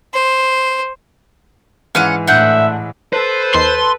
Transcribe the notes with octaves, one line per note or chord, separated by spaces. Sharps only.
C5
G#2 E3 C#4 F5 F#5 D#7
A2 D4 E5 F#5 G6
A4 B4 C5
D#2 D#3 C6